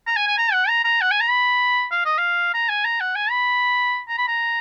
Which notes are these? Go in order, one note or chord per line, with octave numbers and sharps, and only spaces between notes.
A#5
G#5
G#5
A#5
F#5
A#5
A#5
F#5
G#5
A#5
B5
F5
D#5
F5
A#5
G#5
A#5
F#5
G#5
B5
A#5
B5
A#5